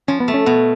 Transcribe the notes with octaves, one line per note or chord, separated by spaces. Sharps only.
F3 C#4
B3
A3
C#4
B2 B3